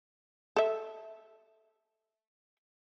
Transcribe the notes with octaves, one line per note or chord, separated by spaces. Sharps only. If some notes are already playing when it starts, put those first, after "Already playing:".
A4 E5